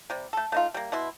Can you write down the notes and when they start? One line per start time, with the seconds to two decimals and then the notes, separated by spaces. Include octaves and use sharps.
0.10 C3 G3
0.33 A3 A4
0.52 A3 D#4 F4
0.74 G3 A#3
0.92 B2 E4 C6